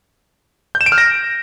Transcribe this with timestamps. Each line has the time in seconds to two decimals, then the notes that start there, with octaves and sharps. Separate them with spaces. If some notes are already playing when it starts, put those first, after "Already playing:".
0.75 G6
0.81 E7
0.86 D7
0.92 F6
0.98 A#6